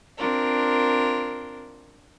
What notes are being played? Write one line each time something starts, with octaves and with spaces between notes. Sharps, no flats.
C4 D4 F4 A#4